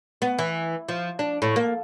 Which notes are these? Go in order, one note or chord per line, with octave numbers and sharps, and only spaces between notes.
B3
E3
F3
D4
A2
A#3